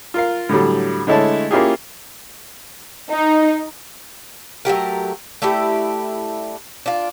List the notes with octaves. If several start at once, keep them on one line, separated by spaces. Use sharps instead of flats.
F4 A#4 F5
A2 D3 F#3 G3
D3 G#3 A3 E4 C#5 A5
A#3 C#4 E4 F4 G4 G#4
D#4
F#3 A3 G4 A#4
A3 D4 E4 G4
D4 F4